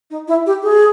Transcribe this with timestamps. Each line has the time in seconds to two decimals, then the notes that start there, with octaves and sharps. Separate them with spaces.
0.11 D#4
0.28 E4
0.46 G4
0.63 G#4